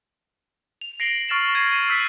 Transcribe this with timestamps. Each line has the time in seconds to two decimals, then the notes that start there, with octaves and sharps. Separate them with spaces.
0.81 F7
1.00 A#6 C7 D7 F#7 G7
1.28 C#6 F6 A6 D7 E7 F#7
1.55 G#6 C7 D#7 E7
1.89 E6 F#6 B6 D#7